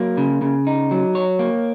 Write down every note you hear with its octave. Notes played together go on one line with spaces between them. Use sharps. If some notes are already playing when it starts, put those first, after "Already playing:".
Already playing: F#3 A#3
C#3
C#3
D#4
F#3
C#5
A#3